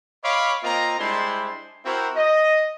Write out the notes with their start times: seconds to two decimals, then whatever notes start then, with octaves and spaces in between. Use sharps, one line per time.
0.24 C#5 D#5 F5 B5 C6 D6
0.64 A#3 C4 F4 A#4 D#5 A#5
0.99 G3 G#3 D4 E4 C5 C6
1.85 C4 E4 F#4 A#4 C5
2.16 D#5